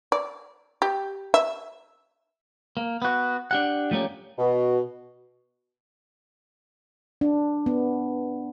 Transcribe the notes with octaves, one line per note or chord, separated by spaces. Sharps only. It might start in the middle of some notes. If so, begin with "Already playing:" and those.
D5
G4
E5
A#3
B3 F#4
D4 G4 F#5
F3 A3 A#3 C#4 G4
B2
D4
B3